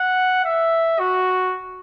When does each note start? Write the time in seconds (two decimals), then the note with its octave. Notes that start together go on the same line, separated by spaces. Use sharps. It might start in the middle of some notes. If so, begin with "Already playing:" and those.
Already playing: F#5
0.45 E5
0.99 F#4